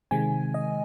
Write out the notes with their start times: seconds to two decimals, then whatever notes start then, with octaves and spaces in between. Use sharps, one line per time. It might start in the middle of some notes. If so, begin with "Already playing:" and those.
0.11 C3 D#3 G#3 C4 G#5
0.54 D#5